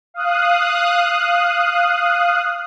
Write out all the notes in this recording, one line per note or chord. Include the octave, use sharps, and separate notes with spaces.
F5 D#6 F#6